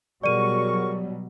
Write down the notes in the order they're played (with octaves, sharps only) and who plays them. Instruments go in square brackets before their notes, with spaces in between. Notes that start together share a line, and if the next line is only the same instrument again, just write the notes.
[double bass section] B2 F#3 G3 [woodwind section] G#4 A#4 C#6 [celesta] D5 D#7